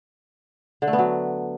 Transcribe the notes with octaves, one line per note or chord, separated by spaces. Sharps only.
D3
A3
B3
F#3